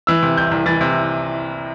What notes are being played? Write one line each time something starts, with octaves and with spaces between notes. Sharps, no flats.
E3 E6
C3
C2 G6
C2
E3 A6
C3